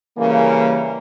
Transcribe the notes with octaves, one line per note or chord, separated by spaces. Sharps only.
C#3 E3 G3 A#3